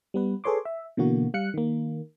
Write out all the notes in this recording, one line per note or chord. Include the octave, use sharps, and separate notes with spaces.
G3 B3 B4
G#4 A4 B4 C#5 C6 D6
E5
B2 D3 E3 A#3 F#4
G3 F5 F#6 C#7
D#3 A#3